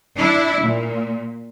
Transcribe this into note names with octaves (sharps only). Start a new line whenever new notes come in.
D4 E4
A#2